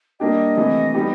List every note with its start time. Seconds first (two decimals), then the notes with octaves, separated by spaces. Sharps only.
0.20 G3 A#3 D4 G4 D#5
0.57 C3 E3 A3
0.94 G3 B3 D#4 G4